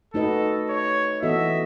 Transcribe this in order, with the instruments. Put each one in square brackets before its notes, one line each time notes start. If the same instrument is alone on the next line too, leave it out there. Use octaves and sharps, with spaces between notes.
[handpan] A3 D#4 F#4 B4 D#5 [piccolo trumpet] A4
[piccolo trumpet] C#5
[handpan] E3 B3 F#4 A4 D#5 [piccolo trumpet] E5